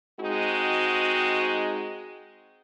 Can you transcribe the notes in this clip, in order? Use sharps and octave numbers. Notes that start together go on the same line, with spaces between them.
G#3 C4 D#4 F#4